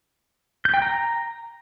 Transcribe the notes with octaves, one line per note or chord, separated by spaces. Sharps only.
G6
G5
A#5